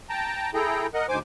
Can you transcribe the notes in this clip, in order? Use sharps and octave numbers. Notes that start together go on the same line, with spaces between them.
G5 A5 A#5
E4 G#4 A4 G5 A#5
A#4 D#5 F#5
D2 G#2 C5 G#5 D6